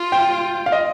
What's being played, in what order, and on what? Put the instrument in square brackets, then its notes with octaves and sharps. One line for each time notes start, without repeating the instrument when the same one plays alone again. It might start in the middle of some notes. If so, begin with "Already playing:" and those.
Already playing: [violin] F4
[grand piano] G5
F5
D#5